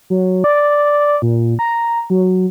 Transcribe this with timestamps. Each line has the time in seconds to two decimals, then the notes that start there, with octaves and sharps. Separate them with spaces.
0.10 F#3
0.44 D5
1.22 A#2
1.59 A#5
2.10 F#3